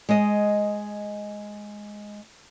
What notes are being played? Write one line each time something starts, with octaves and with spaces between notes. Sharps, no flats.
G#3 D#5